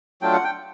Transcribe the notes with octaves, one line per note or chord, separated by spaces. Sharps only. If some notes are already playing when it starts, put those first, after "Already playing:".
F#3 A3 D4 F4 G5
F#5
G5